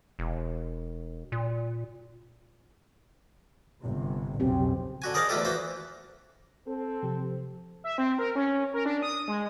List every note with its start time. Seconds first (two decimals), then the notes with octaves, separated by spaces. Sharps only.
0.19 E1
1.32 A#2
3.82 G1 C3
4.40 B1 F2 C#3 C4 G4
5.02 D3 F#4 G#5
5.14 G#4 A#4 C5 D5 D#5 F5
5.29 E2 G3 A3 F4 G4 A4
5.45 E3 A#3 F#4 C5
6.67 C4 A4
7.03 C3 F3 G4
7.84 E5
7.98 C4
8.19 A#4
8.35 C#4
8.74 A#4
8.86 D4
9.02 D#6
9.28 G#3